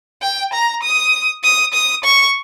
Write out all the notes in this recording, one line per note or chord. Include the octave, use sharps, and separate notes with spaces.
G5
A#5
D#6
D#6
D#6
C#6